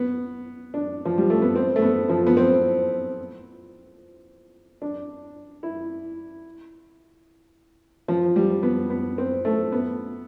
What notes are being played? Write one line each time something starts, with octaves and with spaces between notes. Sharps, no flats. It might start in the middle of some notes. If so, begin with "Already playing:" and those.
Already playing: B3
D4
F3
G3
A3
B3
C4
A3
B3
F3
B3
C4
D4
E4
F3
G3
B3
B3
C4
A3
B3